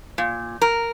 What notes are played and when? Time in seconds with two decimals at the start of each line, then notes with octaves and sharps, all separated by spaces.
0.18 A#2
0.61 A#4